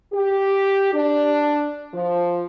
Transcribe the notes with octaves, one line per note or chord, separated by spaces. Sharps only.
G4
D4
F3